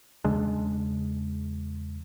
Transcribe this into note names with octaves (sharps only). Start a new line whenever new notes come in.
E2 C#3 G#3 D4